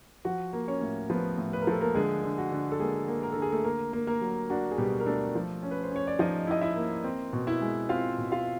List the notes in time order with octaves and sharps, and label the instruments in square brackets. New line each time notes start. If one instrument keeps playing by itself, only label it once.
[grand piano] F3 F#4 F#5
A#3
C#4 C#5
A2
F3 B3 B4
A2
B4
A#4
F3 A4
A#3 A#4
D3 G#3 G#4
D3
F#4
D3
A4
G#3 A#3 G#4
A#3
A#4
D3 A4
G#4
A3 A4
A#3 A#4
A#3
A#3 A#4
F#3
D4 F#4
G#4
B2 G3 G4
A#4
A3 D4 A4
F3
C#4
B4
C5
C#4 C#5
D5
F3 D#4 D#5
E4 D#5
E4 E5
A#3
C4
B2
E4 E5
G#3
C4 F4 F5
B2
F4 F5